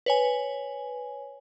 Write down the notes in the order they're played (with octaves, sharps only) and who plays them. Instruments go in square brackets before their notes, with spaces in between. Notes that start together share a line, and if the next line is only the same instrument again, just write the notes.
[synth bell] B4 C#5 G#5